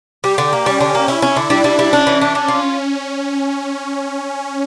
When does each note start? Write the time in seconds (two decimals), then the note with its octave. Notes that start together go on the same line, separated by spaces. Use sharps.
0.24 G3 G4
0.38 D3
0.53 A#3
0.66 G3 C#4
0.81 D3
0.95 A#3
1.08 C#4 E4
1.22 C#4
1.36 D3
1.50 G3 D4
1.64 G3
1.79 G3
1.93 C#4 D4
2.07 E3
2.21 D4
2.35 D4
2.48 F4